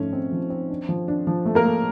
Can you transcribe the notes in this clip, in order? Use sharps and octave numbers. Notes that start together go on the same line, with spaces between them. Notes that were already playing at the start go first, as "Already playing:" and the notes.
Already playing: G#2 F3 A3 C#4
C4
F3
C4
D4
F3
D4
F3
A3
A#3 A#4
A3